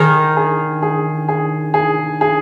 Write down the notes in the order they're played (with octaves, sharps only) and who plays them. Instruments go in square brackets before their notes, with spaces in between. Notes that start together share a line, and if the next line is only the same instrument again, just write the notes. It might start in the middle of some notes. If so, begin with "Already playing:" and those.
Already playing: [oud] D#3 [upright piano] G#4
[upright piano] G#4
G#4
G#4
G#4
G#4